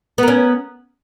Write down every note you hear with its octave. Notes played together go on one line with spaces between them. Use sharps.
B3 C#4 A#4